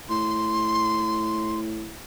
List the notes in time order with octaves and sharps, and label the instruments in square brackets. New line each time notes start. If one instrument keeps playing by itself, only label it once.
[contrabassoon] A2 [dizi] C6